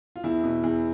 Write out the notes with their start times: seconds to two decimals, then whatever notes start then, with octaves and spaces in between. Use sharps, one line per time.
0.16 F4
0.23 E2 E4
0.44 B2
0.63 E2